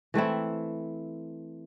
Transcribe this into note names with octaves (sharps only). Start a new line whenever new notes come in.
E3 A3 C4 E4